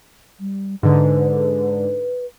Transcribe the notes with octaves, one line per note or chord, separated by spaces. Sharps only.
G3
G#2 D3 B4